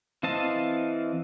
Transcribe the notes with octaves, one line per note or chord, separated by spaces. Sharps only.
E3 C4 D#5 F5 A5